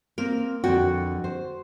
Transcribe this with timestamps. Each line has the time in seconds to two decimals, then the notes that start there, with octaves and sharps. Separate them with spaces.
0.18 A#3 C4 A#4
0.64 F2 D3 F#4 G5
1.24 C5